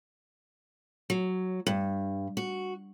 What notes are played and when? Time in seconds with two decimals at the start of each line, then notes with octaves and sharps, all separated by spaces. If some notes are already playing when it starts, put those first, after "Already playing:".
1.10 F#3
1.67 G2
2.37 F#4